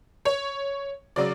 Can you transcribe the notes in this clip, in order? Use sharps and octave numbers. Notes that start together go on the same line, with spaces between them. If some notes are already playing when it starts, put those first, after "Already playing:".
C#5
C#3 F#3 D5